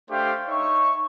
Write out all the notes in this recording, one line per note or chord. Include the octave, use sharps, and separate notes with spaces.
A3 D4 G4 C5 F5 G5
D#4 C#5 E5 C#6